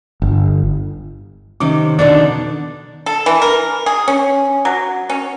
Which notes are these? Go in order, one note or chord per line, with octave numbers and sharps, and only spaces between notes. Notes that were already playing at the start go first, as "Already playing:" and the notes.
G1
C3 D#3 C#4 D6
B2 D3 D#3 D4 D5
A4
E3
A#4
G#4
C#4
F#3
C#4